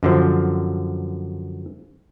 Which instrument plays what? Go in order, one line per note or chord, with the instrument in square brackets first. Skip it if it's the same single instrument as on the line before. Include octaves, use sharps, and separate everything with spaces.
[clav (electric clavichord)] F#2 D3 F3